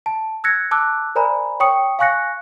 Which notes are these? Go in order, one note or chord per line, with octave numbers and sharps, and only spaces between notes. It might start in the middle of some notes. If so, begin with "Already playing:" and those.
A5
E6 F#6 G#6 A#6 C#7
A5 D6 E6 F#6
A#4 C5 D5 G#5 A#5 B5
C#5 G5 C#6 D#6 C#7
F5 G#5 C#6 F#6 A#6 C#7